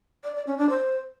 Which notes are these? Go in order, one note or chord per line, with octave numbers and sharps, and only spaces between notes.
D5
D5
C#4
D4
C5